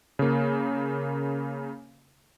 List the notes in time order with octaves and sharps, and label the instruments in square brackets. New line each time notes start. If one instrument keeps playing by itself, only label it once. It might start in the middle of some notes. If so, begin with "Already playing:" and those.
[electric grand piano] C#3 A#3